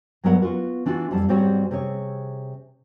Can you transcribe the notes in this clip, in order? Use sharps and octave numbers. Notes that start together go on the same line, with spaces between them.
G2 F#3 G#3 B3 A#4 F#5
B3 F4 F#4
E3 D4 F4 F#4
F2 G3 A5
G#2 G3 C4 F#4 C#5
C3 G#4 C#5